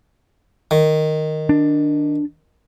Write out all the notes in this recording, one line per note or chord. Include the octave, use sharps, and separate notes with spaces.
D#3
D4